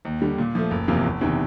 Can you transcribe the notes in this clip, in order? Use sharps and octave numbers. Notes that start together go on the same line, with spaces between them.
D#2
D3 G3
A#2
F3 A3
F#1
E2 C3 F3 A#3
F#1
E2 C3 D#3